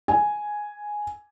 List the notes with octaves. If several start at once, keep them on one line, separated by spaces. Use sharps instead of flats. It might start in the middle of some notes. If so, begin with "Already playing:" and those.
G#5